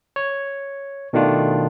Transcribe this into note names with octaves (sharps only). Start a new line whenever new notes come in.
C#5
B2 D#3 A3 D4 F4